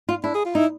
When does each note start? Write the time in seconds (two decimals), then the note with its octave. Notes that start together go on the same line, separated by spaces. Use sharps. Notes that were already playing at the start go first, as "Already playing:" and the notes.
0.09 F4
0.24 D4 E4
0.34 G#4
0.45 F4
0.55 D#4 E4